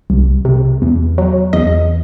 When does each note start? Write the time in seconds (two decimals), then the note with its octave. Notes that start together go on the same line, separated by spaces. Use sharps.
0.10 C2
0.45 C3
0.82 E2
1.18 F#3
1.53 E2 D#5